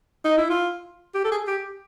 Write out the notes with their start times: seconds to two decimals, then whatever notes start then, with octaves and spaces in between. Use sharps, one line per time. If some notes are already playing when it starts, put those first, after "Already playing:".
0.24 D#4
0.37 E4
0.50 F4
1.14 G4
1.24 A4
1.31 G#4
1.47 G4